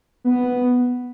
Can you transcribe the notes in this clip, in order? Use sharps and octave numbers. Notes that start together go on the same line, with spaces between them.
B3